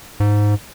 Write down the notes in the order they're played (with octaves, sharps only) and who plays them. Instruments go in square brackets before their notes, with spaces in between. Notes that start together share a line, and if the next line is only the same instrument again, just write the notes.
[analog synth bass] G#2